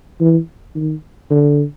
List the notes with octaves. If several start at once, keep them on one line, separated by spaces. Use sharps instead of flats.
E3
D#3
D3